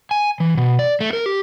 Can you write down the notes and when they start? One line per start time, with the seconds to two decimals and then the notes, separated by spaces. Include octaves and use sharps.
0.11 G#5
0.40 E3
0.57 B2
0.79 D5
1.01 A3
1.13 A#4
1.26 G4